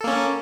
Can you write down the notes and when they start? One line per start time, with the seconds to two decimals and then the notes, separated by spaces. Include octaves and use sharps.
0.01 A4
0.04 A#3
0.07 C#4